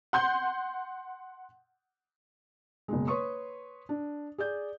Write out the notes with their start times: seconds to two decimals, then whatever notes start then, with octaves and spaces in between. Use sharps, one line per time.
0.13 F#5 C6 G6
2.88 F#1 B2 G#3
3.07 B4 C#5 C6 C#6 D#6
3.89 D4
4.38 G#4 D5 G6